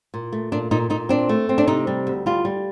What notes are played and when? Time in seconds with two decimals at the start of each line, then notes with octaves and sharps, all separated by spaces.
0.14 A#2
0.33 A3
0.52 A#2 D4
0.71 A#2 D#4
0.90 A#2 D#4
1.09 C4 D4
1.29 A3
1.49 C4
1.58 D4
1.67 C3 D#4
1.87 G3
2.07 D2
2.26 G3 F4
2.45 G3